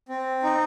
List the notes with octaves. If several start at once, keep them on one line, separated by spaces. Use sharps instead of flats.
C4
D#4